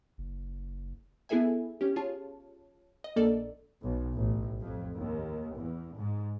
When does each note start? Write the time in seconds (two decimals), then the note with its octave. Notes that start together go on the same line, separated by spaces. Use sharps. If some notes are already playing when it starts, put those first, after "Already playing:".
0.18 F#1
1.29 B3 E4 G#4 A4 E5 G#5
1.81 C#4 G4
1.96 F4 G#4 C#5 A5
3.04 D#5
3.16 A#1 A#3 A4 D5
3.82 B1
4.15 A1
4.61 F2
4.97 D#2
5.57 E2
5.96 G#2